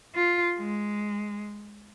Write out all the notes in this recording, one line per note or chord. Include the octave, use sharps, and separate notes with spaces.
F4
G#3